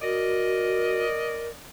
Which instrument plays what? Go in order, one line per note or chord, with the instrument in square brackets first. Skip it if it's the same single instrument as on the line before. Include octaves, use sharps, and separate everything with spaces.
[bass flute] F#4 [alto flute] A#4 [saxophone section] D5 D#5